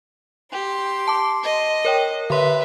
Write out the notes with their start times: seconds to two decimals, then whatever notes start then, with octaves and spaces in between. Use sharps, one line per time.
0.52 G4 C6
1.08 A5 D6
1.44 D#5
1.85 A#4 C#5 G5
2.30 D3 B4 E5 C6